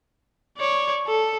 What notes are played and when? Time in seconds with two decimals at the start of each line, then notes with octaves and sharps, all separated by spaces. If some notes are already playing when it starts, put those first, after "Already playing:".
0.58 C#5 D5
1.07 A4